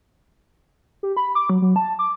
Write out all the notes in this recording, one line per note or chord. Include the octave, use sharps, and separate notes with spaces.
G4
B5
D6
F#3
F#3
A5
D6